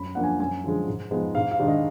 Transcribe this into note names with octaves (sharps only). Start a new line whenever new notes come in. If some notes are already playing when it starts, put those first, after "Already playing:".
Already playing: F#2 B5
F3 A#3 D4 F#5
G#5
F#2 G#5
D3 F3 G#3
G#2
F3 G#3 B3 D#4
G#2 F5
F5
D#3 G#3 D4
D#5